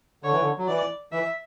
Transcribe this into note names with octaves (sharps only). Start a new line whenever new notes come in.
D3 C#5
E3
D3
F#3
E3 D5
E3 E5